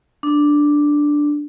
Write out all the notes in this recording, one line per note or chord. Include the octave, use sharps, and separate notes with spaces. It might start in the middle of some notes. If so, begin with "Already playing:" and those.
D4